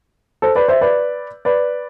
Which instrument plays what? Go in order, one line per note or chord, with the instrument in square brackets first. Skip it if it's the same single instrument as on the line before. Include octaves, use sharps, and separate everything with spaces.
[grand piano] A4 C5
B4 D5
C5 E5
B4 D5
B4 D5